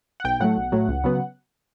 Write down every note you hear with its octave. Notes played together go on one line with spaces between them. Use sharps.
F#5
B1 G5
A2 F#3 A3 F#5
B1
A2 F#3 A3
C#2
C#3 F#3 B3